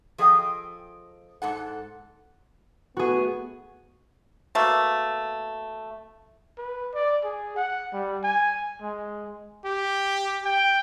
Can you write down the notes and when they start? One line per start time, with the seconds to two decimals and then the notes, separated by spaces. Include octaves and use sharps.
0.18 F3 G#4 A4 D#5 G5
1.42 G#2 A4 F#5
2.97 A3 B3 F#4 G#4
4.55 B2 A3 A#3
6.58 B4
6.94 D5
7.24 G#4
7.56 F#5
7.93 G3
8.24 G#5
8.82 G#3
9.65 G4
10.45 G5